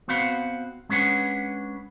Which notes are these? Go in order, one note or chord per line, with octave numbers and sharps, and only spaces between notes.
B3 C4 F#4 F5 B5
G#3 C#4 D4 B4 F#5 G#5